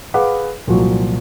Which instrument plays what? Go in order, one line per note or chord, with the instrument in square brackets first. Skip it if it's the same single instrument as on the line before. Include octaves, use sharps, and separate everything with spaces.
[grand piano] G#4 B4 F5 F#5 B5 D6
C2 A#2 F3 F#3 F#4